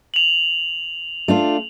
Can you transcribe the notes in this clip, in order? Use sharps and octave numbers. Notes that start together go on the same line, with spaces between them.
F7 F#7
A3 D4 F4